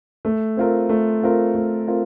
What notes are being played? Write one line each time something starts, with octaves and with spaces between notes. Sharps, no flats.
A3
C4 F4 A#4
A3
C4 F4 A#4
A3
C4 F4 A#4